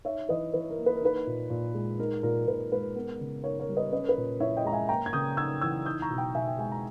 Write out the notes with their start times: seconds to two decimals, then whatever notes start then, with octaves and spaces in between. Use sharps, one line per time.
0.05 D#4 C#5 E5
0.29 E3 B4 D#5
0.54 E3 B4
0.70 A#4
0.78 A#3
0.86 B4
0.96 A#4
1.02 D#4 B4
1.27 A#2
1.50 A#2
1.75 G#3
1.99 D#4 A#4
2.23 A#2 A#4
2.47 A#2 B4
2.72 G#3 B4
2.95 B3 A#4
3.20 C#3
3.44 D#4 A#4 C#5
3.60 A#4 C#5
3.69 G3
3.77 B4 D#5
3.92 C#4 B4 D#5
4.04 A#4
4.09 B4
4.17 A#2
4.40 E4 C#5 E5
4.57 D#5 G5
4.65 G#3 A#5
4.73 E5 G#5
4.89 A#3 G5 A#5
5.06 G#6
5.13 C#3 D#6 G6
5.37 D#4 E6 G#6
5.61 E3 E6 G#6
5.86 D#4 D#6 G6
6.02 A#5 C#6
6.10 B2
6.18 G5 A#5
6.34 B2 E5 G#5
6.48 G5
6.58 G#3 G#5
6.72 A#5